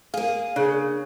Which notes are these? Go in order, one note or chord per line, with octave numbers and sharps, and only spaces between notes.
A#3 G#4 F5
C#3 D4 F#6